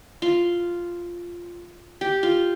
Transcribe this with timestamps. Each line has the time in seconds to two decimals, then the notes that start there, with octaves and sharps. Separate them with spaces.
0.22 F4
2.01 G4
2.23 F4